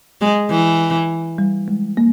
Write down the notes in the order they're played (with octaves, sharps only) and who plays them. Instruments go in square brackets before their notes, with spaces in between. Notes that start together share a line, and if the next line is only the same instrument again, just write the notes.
[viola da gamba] G#3
E3
[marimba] G3
G#3
A#3